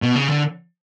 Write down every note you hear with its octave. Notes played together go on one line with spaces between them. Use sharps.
B2
C#3
D3